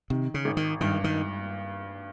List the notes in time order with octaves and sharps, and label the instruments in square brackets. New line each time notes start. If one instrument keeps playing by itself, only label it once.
[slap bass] C3 [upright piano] D#3
[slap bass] C#3
[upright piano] G#1
[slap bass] D#3
[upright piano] G2 [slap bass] D#3
[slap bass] D#3